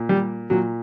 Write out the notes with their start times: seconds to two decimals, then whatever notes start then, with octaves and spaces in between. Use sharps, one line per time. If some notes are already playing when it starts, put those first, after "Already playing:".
Already playing: A#2
0.09 G3
0.50 A#2 F#3